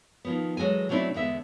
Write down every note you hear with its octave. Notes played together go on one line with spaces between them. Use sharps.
D#3 F3 B3
E3 F#3 G#3 A4 G#5
C3 F#3 A3 C4 D4 E4
E2 D3 G#3 B3 E5